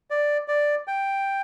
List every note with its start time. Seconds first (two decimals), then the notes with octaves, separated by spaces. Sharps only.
0.10 D5
0.48 D5
0.88 G5